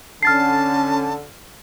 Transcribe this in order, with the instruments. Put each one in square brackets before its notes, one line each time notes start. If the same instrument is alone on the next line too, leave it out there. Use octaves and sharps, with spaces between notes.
[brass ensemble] D3 [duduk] C#4 [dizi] A5 [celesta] F6 A6 C7